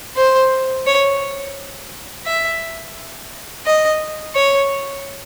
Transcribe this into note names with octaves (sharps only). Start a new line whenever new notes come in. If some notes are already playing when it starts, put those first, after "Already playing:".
C5
C#5
E5
D#5
C#5